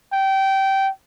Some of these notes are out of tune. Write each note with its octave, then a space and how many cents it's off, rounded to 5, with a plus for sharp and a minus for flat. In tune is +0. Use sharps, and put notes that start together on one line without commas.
G5 -20